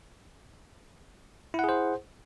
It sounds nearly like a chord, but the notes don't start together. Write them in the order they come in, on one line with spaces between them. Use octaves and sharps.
E4 F#5 G#4 C5